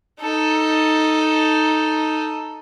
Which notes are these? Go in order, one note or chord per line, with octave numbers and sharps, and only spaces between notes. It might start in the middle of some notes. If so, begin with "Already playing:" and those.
D#4 A4